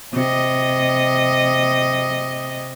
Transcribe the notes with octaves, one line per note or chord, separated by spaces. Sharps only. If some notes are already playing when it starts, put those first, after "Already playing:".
C3 D#5